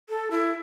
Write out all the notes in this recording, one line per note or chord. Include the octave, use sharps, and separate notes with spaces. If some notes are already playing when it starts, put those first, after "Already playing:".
A4
E4